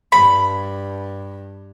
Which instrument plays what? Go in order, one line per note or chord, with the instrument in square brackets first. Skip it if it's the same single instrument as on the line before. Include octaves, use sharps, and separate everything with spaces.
[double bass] G2 [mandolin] B5